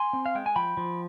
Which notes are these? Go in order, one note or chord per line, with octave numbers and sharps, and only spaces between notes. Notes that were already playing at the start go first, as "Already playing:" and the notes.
Already playing: G#5 C6
C4
F5
G#3 G5
G#5
F3 G5 B5
F3